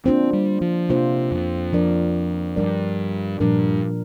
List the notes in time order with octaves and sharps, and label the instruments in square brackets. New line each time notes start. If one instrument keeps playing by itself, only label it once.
[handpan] A#3 D4 F4 C5 [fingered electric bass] C4
[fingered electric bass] G3
F3
[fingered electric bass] C3 [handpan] A#3 D4 F4 C5
[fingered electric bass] F2
[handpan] F3 D4 A#4 D5
[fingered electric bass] G2 [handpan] F3 D4 A#4 D5
[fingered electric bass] G2 [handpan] A#2 F3 D4 A#4